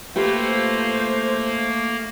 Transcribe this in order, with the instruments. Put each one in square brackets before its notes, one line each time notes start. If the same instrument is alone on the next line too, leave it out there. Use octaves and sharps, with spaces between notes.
[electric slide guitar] A3 [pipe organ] A#3 [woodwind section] F4 C5 [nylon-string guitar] G4 B4